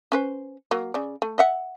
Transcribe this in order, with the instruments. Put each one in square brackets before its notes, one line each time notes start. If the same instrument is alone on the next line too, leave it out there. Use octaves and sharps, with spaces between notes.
[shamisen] C#4 B4 C5
F#3 A#3
C#3 D5
A3
D#5 E5 F#5